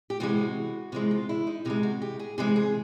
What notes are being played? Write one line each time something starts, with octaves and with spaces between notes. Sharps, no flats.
G4
C3 E3 G#3 F#4
C3 E3 G#3 F4
F4
E4
D#4
C3 E3 G#3 D#4
F#4
G4
G#4
C3 E3 G#3 G#4
G#4